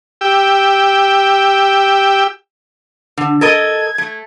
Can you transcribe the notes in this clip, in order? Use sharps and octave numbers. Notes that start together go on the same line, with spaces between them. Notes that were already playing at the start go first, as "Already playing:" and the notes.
G4 G5 E6
D3
A4 A#4 D#5 G#6
A3